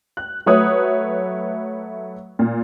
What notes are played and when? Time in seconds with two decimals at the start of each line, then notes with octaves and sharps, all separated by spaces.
0.17 F#6
0.46 F#3 A3 B4 C#5 D#6 F#6
2.39 A#2